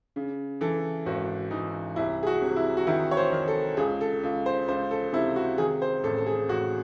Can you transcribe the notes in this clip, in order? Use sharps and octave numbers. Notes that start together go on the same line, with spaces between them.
C#3
E3 A4
G#1 F#4
E3 D#4
C2 E4
G#4
F#4
C3
E4
F#4
D#3 E4
C#5
C5
D#3
A4
C#2 G#4
A4
C#2
C5
C#2 C5
A4
C3 E4
F#4
D#3 G#4
C5
A1 A4
A4
G#4
A1 F#4